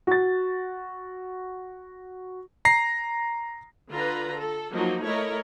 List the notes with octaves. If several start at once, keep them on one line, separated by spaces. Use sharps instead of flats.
F#4 A6
A#5 A#6 C7
D3 F4 B4 A#5
A4
F3 F#3 A#3 D#4
A3 E4 A#4 C#5 D#5